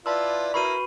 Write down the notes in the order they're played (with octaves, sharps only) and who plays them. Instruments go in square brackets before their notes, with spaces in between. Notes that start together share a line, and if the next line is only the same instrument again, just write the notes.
[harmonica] E4 F4 B4 [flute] D5 [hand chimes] A5 C6 E6
[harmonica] E4 A#4 [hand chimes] F#4 B4 C#6 [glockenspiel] B5 D#7